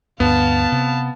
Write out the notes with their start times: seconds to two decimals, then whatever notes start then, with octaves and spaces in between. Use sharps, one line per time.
0.20 D2 G2 B3 F5 A5
0.72 C3